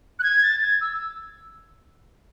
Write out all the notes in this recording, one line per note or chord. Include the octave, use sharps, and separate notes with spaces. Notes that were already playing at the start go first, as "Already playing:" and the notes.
F#6
G#6
A6
G#6
E6